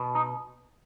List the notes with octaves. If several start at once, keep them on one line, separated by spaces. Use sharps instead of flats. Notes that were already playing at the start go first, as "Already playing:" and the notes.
Already playing: B2
D#4